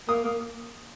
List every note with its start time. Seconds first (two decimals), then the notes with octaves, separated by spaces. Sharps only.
0.08 A#3 D#6
0.25 A#3